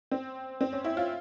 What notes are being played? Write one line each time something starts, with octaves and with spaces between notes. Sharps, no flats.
C4
C4
C#4
E4
F4